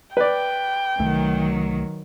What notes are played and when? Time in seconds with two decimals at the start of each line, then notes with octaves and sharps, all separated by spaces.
0.17 B4 D5 G5
0.99 C2 D#3 F#3 A3